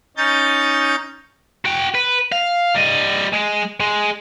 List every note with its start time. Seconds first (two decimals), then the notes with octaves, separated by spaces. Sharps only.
0.17 C#4 D#4 G6 A6
1.65 F#4 G5
1.95 B4
2.32 F5
2.75 G3 D#5
3.33 G#3
3.80 G#3